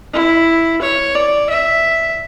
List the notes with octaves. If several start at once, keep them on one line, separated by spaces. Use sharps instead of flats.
E4
C#5
D5
E5